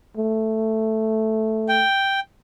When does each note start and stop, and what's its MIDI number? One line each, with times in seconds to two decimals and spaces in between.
0.17 1.84 57
1.69 2.20 79